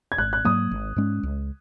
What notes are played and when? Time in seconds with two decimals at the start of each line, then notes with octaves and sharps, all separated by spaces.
0.12 G#6
0.18 G#1 F#6
0.33 F#6
0.45 G#2 F#3 A#3 D#6
0.71 G#1
0.96 G#2 G#3 C#4
1.23 C#2